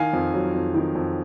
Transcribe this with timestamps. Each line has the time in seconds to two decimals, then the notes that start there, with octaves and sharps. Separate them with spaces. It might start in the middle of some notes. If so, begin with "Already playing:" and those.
Already playing: D#3 F5 G#5
0.13 F2
0.34 F#3
0.54 F2
0.74 D#3
0.95 F2